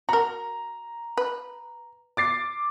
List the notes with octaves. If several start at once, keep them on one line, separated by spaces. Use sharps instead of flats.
F#4 A#4 A#5
B4
D6 A6 C7